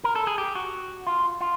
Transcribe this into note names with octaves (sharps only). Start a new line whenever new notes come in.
A#4
A4
G#4
G4
F#4
F4
F4